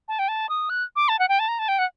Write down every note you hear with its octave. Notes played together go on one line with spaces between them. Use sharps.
A5
G5
A5
D#6
F#6
D6
A5
F#5
G5
A5
A#5
A5
G5
F#5